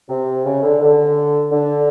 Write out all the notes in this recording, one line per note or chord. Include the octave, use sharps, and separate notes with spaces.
C3
C#3
D3
D3
D3